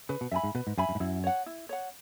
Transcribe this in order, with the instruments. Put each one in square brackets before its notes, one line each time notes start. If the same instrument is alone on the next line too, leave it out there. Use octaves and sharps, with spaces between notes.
[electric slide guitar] C#3 [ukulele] B4
[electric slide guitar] B2
[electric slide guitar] F#2 [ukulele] E5 G#5 B5
[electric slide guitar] G#2
[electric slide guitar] B2 [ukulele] B4
[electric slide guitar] G#2
[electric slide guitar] F#2 [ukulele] E5 G#5 B5
[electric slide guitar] F#2
G#2
[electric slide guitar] F#2 [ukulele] E4
[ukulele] C#5 F#5
E4
C#5 F#5